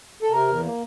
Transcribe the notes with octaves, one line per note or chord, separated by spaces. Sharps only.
A4
C3 A#4
E2
A#3